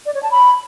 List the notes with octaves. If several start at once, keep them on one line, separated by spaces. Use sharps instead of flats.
D5
C#5
A5
B5